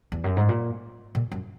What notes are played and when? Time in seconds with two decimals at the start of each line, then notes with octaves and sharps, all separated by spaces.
0.12 E2
0.24 F#2
0.37 G#2
0.49 A#2
1.15 A#2
1.32 F#2